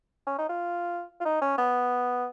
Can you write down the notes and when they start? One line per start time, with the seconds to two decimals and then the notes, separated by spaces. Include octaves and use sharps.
0.27 C#4
0.38 D#4
0.49 F4
1.20 F4
1.25 D#4
1.41 C#4
1.58 B3